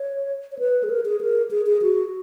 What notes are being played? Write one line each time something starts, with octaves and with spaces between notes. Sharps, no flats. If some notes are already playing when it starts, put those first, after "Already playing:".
Already playing: C#5
C#5
B4
G#4
A#4
G#4
A#4
G#4
G#4
F#4